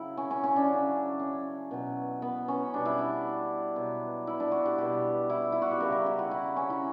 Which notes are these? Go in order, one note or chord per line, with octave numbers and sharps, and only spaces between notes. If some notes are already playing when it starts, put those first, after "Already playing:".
Already playing: C#3 F#3 E4
C#4
C#4
C#4
D4
C#3 F#3
C#4
B2 F#3
B3
C#4
B2 G3 D4
E4
D4
B2 F#3
E4
D4
F#4
G4
B2 G3 G4
E4
E4
F#4
G4
C#3 G3 A#4
A#4
F#4
F#4
E4
C#4
E4